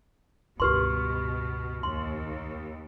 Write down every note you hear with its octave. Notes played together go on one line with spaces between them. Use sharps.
C#2 G2 B2 G4 B4 C6 C#6 F6
D#2 C6